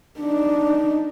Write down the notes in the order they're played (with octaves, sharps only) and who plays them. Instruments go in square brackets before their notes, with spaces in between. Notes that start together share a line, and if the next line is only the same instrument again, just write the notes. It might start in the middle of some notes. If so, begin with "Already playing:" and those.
[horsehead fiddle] D4 D#4